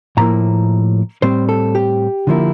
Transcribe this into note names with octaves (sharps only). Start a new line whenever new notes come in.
A2 F3 A#3 E4 A#5
A2 G3 C4 C5
A4
G4
D3 F3 A#3 E4